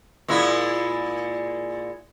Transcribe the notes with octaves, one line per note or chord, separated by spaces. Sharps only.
A#2 G#3 E4